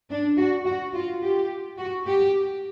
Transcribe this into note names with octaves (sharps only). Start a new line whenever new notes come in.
D4
F#4
F#4
F4
G4
F#4
G4